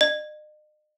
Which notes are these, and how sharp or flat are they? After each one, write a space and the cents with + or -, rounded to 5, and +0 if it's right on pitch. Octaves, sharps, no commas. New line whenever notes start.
D#5 -45